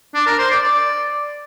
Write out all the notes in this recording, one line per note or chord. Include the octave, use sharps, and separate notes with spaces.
D4
A#4
C5
D5
D5